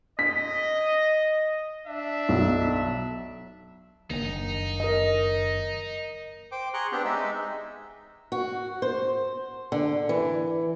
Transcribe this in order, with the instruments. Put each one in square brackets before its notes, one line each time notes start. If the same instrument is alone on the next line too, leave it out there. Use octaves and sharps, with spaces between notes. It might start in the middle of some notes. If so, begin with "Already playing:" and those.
[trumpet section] D#5 [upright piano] B6
[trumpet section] D4 E5
[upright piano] B1
[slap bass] F#1 G2 D#3 [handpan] A#3 [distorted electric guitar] D#4
[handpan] A#4 D#5
[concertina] C5 G5 D6
G#4 A#5 C6 C#6 F#6
B3 C4 D4 G4
G#3 D#4 E5
[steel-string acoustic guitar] F#4
C5
D3
E3